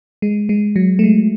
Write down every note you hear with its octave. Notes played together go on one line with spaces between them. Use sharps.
G#3
G#3
F#3
A3
G#3